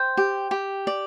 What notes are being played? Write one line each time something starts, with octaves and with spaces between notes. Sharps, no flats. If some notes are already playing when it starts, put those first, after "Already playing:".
Already playing: C5 G5
G4
G4
D5